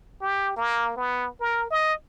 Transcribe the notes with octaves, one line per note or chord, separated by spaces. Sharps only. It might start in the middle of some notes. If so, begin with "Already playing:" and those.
G4
A#3
B3
A#4
D#5